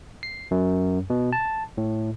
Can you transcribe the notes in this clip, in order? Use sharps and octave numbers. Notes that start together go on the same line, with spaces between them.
C7
F#2
B2
A5
A2